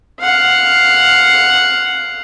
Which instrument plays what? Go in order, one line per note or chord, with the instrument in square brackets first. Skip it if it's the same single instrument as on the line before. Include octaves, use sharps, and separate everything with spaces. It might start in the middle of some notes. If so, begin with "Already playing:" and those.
[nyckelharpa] F5 F#5